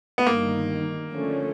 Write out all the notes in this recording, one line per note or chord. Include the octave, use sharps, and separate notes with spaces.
B3
G1 G2 D#3 A#3
D3 F3 A3 C#4